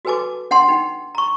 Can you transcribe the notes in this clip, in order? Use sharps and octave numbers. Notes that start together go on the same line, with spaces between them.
F#4 A4 B4 G#5 A5 D6
D4 F#5 G5 A5 C6
D#4 G5
A#5 C#6